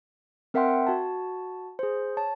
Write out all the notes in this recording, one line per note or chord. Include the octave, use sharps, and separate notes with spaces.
C4 A#4 E5 F#5 G5 C6
F#4 A5
G#4 C5
C#5 A5